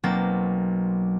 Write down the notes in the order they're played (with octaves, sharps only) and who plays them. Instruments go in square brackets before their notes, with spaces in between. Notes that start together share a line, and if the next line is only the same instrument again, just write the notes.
[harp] B1 F#3 A#3 C4 A6